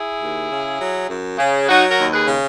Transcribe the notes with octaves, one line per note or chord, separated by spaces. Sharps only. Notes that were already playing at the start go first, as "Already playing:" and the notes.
Already playing: E4 G#4
D#2
C#3
F#3
F#2
C#3
F#3 D#4 F#4
F#4 A#4
D#2
G#4 B4
C#3